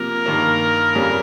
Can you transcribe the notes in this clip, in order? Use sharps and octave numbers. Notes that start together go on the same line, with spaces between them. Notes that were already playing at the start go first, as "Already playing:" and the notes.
Already playing: C3 F3 A#3 A#4
G2 D#3 A#3
F2 C#3 G3